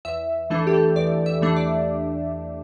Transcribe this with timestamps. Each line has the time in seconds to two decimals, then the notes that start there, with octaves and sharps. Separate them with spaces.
0.05 E2 E5
0.50 E3 A3 D4 A4
0.67 G4
0.74 A4
0.96 E2 D5
1.26 E5
1.41 E3 A3 D4
1.56 D5